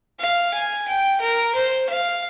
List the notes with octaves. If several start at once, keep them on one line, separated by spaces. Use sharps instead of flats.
F5
G#5
G5
A#4
C5
F5